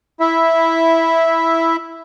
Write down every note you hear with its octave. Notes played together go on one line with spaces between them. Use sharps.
E4 E5